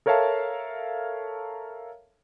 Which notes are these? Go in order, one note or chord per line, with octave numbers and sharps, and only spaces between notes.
A4 A#4 C#5 E5 F5 A5